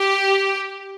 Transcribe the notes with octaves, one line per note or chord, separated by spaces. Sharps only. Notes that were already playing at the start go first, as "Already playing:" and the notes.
Already playing: G4